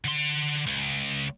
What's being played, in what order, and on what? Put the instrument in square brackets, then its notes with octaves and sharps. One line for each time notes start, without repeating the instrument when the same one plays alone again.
[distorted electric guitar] D3 C6
C#2